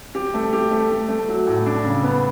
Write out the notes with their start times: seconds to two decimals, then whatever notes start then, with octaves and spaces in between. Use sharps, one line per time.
0.15 G4
0.34 A3
0.53 G4
0.71 A3
0.90 A3
1.08 A3
1.28 F#3
1.47 A2
1.66 D4
1.85 C#3
2.03 B3